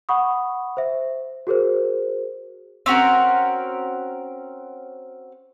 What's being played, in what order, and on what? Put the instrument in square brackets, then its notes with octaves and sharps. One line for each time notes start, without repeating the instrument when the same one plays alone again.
[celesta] F#5 B5 C#6 D#6
C5 E5
F#4 G#4 A#4 C5
[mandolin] C4 C#4 F#4 A#4